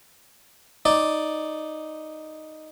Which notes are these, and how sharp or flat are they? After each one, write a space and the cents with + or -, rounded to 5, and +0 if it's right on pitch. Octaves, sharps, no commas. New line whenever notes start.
D#4 +0 D5 +0